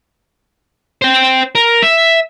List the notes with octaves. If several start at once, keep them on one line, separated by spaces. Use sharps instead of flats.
C5 G5
A#4
E5